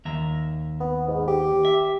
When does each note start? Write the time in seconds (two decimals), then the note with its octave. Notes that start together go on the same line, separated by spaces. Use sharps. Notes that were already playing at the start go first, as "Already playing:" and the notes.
0.05 D#2 E5 A#5
0.80 B3
1.08 G#2
1.27 G4
1.65 E5